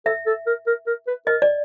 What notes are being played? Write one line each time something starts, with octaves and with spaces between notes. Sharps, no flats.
A4 E5
A4
A#4
A#4
A#4
B4
A#4 D#5
D5